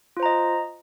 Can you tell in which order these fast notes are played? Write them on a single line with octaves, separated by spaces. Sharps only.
F4 C5 A#5 D#5